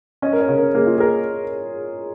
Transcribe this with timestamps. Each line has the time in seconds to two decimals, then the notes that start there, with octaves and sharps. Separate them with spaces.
0.22 C#4 D#5
0.33 A#4
0.40 C#5
0.49 C#3
0.58 A#4
0.75 A#3 G#4
0.86 F4
0.97 G#4 A#4